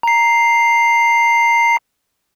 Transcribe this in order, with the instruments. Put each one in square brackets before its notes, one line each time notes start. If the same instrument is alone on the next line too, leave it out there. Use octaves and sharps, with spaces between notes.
[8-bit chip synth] A#5 C7